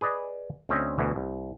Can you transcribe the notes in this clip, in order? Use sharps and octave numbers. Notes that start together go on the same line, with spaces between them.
G#4 B4 D5 D#5
D2 C4 C#4 D#5 E5
D2 B2 E3
C2